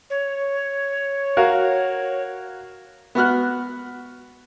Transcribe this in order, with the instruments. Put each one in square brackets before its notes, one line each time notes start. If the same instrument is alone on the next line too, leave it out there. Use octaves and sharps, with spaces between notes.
[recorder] C#5
[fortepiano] F#4 A#4 F5
B3 F#4 F6 F#6